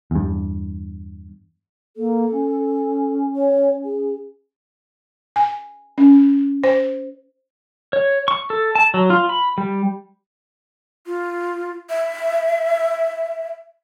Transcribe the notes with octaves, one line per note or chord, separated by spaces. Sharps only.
E2 G2
A#3 A4
C#4
C#5
G#4
G#5
C#4
C5
C#5
C#6
A4
A5
F#3
F4
B5
G3
F4
E5